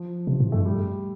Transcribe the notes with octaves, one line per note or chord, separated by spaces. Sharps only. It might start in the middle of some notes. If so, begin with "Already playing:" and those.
Already playing: F3
C3
A2
G2 A3
G3